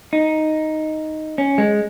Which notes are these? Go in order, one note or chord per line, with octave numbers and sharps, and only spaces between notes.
D#4
C#4
G#3